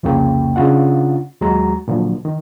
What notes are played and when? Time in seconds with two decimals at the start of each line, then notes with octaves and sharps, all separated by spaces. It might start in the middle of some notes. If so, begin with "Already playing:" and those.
0.03 C2 F2 C#3 A#3 G5
0.56 C#3 D4 F4 F#5
1.41 D#2 F#3 G#3 F#4 A#5
1.88 A#2 D3 F3 F#3
2.25 D#3